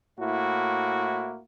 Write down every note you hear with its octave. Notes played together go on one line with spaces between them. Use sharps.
A2 A#3 E4 F#4